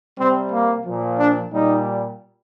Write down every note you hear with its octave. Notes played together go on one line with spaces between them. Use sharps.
C3 G3 C4
A#3
A#2 F3
D4
A#2 G3 D#4